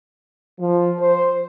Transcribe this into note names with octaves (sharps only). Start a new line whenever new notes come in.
F3
C5